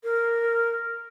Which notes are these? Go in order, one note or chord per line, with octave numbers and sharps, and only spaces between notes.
A#4